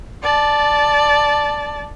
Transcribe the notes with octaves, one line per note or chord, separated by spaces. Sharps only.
D5 A5